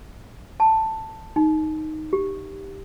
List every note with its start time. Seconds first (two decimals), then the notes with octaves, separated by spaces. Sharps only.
0.60 A5
1.36 D#4
2.13 G4